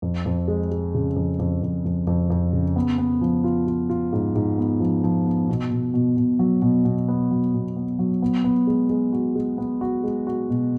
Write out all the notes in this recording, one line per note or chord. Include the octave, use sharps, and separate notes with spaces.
F2
F2
G#3
G#3
C#3
F2
F2
F2
F2
F2
F2
C#3
B3
B3
F3
F4
F4
F4
G#2
G#2
B3
F3
F3
B3
B2
B2
B2
B2
F#3
B2
B2
B3
F#3
B2
B3
F#3
B3
B3
G#3
G#3
F#4
G#3
B3
F#4
G#3
F#4
B2